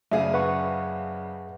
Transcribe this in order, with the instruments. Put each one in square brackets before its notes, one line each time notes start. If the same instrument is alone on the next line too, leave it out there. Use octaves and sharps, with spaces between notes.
[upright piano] F#1 C#3 F5 [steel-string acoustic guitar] G#4 D5 [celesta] E5
[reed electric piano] B4 F#5 C#6